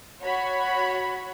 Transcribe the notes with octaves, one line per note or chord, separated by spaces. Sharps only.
F#4 C#5 B5